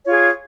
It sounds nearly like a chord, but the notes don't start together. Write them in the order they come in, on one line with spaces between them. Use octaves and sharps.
C#5 F4 G#4